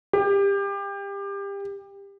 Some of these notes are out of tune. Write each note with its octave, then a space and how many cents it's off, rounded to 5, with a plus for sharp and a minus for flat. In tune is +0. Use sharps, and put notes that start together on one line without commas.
G4 +25